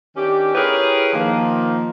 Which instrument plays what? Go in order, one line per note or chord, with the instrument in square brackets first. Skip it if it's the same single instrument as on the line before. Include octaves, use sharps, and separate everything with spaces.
[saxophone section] D#3 C#4 D4 G4
E4 G4 G#4 A#4 B4 C#5
D#3 F3 A#3